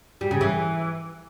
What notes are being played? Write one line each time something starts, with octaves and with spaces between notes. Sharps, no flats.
G3
C#3
E3